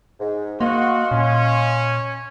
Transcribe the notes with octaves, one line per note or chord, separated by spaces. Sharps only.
G#2
A#3 F#4 D#5 F5 C6
A#2 C#4